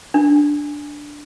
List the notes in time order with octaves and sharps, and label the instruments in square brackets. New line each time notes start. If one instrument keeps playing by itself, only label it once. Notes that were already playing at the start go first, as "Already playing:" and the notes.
[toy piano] D4